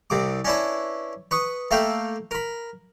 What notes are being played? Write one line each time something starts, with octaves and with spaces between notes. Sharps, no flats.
C2 C3 D6
C#4 D4 E4 B4
B4 C#6 D#6
A3 A#3 E5 F5 G5
A#4 B5